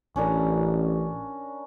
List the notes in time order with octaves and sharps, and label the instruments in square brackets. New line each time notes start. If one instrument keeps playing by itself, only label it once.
[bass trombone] A1 [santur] C#4 D4 A#4